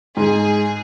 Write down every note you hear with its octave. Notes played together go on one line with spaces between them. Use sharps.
G#2 G#4